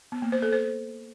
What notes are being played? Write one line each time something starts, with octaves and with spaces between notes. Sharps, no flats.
B3
A#3
C5
A4
C5